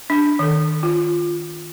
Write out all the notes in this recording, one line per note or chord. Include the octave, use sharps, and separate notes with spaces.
D4
D#3 A4
F4